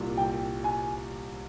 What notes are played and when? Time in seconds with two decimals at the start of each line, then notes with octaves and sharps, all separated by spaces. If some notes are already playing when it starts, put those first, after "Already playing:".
Already playing: C2 A#2 G3
0.17 G5
0.64 G#5